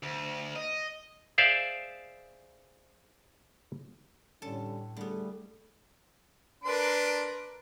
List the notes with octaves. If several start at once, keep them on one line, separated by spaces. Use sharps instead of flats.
D2
D#5
G#4 C5 D5 E5 F5
A2 D3 G3 C#4 A4
D3 G3 A3 B3 G#4
D4 A#4 B4 C6 D7